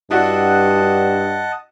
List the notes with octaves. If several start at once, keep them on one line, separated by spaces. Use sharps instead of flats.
G2 D4 E4 F#4 D#5 F#5 A5